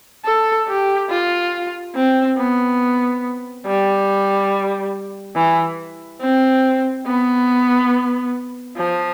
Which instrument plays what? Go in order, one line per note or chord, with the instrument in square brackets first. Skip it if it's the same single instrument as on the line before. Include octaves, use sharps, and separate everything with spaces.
[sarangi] A4
G4
F4
C4
B3
G3
E3
C4
B3
F3